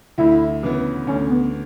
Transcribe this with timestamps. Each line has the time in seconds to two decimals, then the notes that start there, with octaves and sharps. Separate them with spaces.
0.18 D2 E4
0.63 C#3 E3 B3
1.07 D2 C#4
1.30 B3